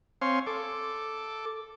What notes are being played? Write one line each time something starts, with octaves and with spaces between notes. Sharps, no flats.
C4 C#5 F5 G#5 C6
A4 D6